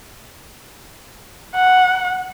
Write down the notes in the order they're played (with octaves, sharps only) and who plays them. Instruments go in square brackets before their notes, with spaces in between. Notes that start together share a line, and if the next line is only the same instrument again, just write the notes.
[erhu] F#5